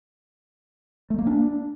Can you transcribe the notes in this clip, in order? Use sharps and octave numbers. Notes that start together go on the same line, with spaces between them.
A3
A#3
D4